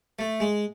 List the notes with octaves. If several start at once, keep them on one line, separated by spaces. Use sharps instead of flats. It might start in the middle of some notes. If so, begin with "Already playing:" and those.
A3
G#3